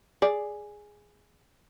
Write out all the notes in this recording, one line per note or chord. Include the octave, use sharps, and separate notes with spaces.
G#4 D5